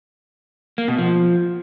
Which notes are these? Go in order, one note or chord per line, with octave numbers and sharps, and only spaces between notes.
A#3
B2
F3